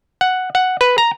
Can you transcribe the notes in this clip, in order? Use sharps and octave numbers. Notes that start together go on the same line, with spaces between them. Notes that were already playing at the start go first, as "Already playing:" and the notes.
F#5
F#5
B4
A#5